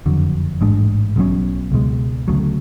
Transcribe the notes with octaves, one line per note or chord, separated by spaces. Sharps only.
F#1 F2 D3 F#3
A1 G#2 G#3 D4
B1 B2 F#3 C#4
C#2 B2 G#3
D2 C#3 F#3 A3